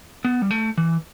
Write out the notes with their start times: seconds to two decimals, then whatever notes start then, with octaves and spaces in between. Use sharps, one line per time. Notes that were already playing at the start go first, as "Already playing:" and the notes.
0.25 B3
0.42 G3
0.51 A3
0.78 E3